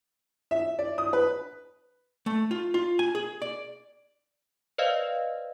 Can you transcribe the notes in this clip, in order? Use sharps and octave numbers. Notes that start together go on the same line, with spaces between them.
E5
D5
D#6
B4
A3
F4
F4
G#5
G#4
D5
B4 C5 D5 D#5 F5